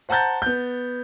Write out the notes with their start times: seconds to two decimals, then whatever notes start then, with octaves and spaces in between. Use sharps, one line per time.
0.09 C5 F#5 A5 A#5 G6 A6
0.42 B3 G6